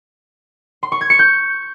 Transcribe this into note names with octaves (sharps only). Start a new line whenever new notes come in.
C6
C#6
G#6
C#7
G6